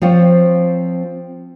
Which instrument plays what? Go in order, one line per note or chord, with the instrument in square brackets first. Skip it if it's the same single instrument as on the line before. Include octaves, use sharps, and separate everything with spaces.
[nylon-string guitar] F3 C4 F4 C#5